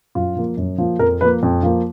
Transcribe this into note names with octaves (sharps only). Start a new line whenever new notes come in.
F#2 F4
F3 A#3
F#2
F3 A#3
F2 A#4
F3 A#3 B4
F2
F3 A#3